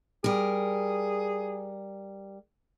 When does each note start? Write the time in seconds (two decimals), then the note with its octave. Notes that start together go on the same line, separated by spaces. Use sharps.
0.24 G3 G#4 A#4